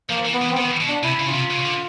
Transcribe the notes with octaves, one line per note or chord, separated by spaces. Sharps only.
F3 A#3
E3
B3
E3
C4
D#3 B3
B2
D4
C3 E4
C#3
F4
C3
C#3
D3